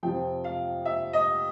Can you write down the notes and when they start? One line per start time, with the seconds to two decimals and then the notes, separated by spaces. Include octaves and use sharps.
0.03 F2 C3 F3 G5
0.44 F5
0.85 E5
1.13 D#5